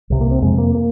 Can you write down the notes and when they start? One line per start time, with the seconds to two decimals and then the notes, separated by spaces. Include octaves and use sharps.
0.10 C2 C3
0.21 A#3
0.31 C4
0.42 F2 C3 G#3
0.58 A#3
0.75 A#3